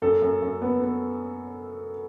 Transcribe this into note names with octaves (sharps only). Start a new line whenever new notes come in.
F#2 A4
F#2
F#2
B3
B3